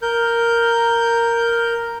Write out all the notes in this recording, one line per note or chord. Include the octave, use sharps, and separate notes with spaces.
A#4 G6